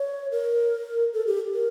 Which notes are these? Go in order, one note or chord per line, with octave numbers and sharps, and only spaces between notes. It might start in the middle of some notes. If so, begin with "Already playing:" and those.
Already playing: C#5
A#4
A4
G4
A#4